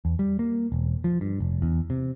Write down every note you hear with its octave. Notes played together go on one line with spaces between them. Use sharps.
E2
G3
A#3
E1
F3
G2
F1
E2
C3